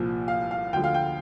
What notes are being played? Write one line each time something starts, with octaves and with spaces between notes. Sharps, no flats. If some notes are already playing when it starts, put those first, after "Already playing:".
Already playing: C2 A#2 F3
F5
F5
D2 D3 F3 G5
F5
G5